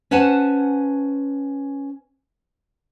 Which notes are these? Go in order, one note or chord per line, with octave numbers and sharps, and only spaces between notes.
C#4 B4 C5 F#5 G#5 A5